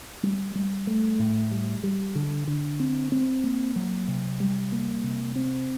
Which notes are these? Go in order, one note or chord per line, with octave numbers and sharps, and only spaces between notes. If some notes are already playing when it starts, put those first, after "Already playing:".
G3
G3
A3
A2
G3
G3
D3
D3
C4
C4
A#3
F#3
C3
G3
A#3
C3
C4